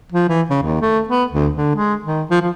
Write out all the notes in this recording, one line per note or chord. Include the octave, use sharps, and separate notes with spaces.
F3
E3
C#3
D#2
A3
B3
D2
D3
G#3
D#3
F3
F3